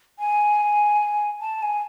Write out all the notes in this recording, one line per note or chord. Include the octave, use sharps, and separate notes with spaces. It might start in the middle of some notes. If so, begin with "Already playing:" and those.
G#5
A5
G#5